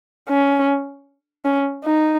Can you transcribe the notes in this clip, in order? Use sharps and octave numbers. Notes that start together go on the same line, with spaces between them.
C#4
C#4
D#4